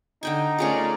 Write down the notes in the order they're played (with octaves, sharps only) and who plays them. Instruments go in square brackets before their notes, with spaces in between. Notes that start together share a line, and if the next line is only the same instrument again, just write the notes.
[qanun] D3 G5 G#5 [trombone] D#4
[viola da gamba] A3 C#4 [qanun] F4 A#4 C#5 [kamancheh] G#4 D5